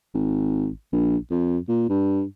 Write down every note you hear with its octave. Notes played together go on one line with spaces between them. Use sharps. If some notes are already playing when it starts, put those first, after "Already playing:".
G#1
A#1
F2
A#2
G2